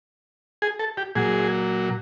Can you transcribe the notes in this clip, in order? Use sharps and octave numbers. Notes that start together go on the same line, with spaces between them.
G#4
A4
G4
A#2 F#3 G#4